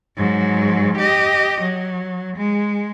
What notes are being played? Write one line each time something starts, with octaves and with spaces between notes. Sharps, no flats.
G#2 F#3
G4 D#5
F#3
G#3